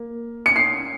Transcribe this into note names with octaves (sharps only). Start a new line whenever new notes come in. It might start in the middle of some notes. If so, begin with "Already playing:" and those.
Already playing: A#3
C#7
C7